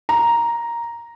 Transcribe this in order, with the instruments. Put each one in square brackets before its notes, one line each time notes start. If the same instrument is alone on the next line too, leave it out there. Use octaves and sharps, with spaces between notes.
[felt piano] A#5